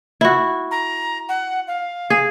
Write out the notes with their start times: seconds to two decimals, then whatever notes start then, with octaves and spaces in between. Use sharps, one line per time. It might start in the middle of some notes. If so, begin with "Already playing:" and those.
0.21 E4 F#4
0.71 A#5
1.29 F#5
1.67 F5
2.10 G#4